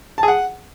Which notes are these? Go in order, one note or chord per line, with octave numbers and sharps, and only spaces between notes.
A5
G#4
F#5